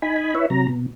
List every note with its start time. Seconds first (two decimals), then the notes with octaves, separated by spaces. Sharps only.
0.02 D#4 G#5 B5
0.35 E4 B4 C#5 E5
0.50 C3 F#3 A#5
0.68 B2